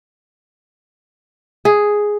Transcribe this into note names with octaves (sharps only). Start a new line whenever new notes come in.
G#4